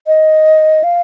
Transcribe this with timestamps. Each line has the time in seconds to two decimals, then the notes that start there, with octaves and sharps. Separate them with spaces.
0.07 D#5
0.84 F5